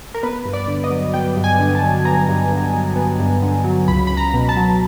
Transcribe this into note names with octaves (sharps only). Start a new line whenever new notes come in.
A#4
B3 B4
G2
D5
D3
D#5
F#3
B3 G5
G2
G#5
D3
A5
F#3
B3 A#5
G2
D3
F#3
B3
G2
D3
F#3
C#2 B5
C#2 B5
A#5
B2
A5
F#3